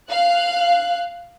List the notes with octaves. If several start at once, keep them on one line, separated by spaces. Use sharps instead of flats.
F5 F#6